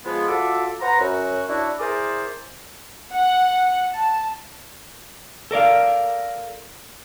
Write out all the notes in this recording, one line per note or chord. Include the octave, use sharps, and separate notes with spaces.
F3 G#3 B3
F4 F#4 A4 D5 E5 D6
B4 C5 F#5 A#5
F#2 F#4
D4 E4 F#4
E4 G#4 A#4 C5 D5 E5
F#5
A5
A4 A#4 D5 F5